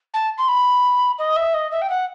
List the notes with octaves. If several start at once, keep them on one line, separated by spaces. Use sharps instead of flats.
A5
C6
B5
D#5
E5
D#5
E5
G5
F#5